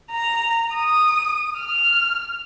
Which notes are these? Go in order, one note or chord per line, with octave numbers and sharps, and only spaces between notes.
A#5
D#6
F6